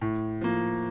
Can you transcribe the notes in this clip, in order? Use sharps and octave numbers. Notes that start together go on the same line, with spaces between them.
A2
F3 A#3